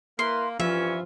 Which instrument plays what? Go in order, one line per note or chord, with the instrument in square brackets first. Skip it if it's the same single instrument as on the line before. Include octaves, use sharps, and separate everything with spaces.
[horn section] A#3 [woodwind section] E4 A#4 B4 [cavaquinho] C6
[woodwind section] G2 C#4 [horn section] E3 F4 [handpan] F3 [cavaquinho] E5